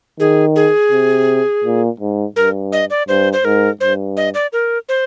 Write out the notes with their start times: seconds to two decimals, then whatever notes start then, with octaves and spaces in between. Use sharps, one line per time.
0.20 D#3 G#4
0.56 G#4
0.91 C3
1.64 A#2
2.00 G#2
2.36 G2 A#4
2.72 D#5
2.90 D5
3.08 G2 C5
3.33 C5
3.44 G#2 A#4
3.81 G2 C5
4.17 D#5
4.34 D5
4.53 A#4
4.89 C5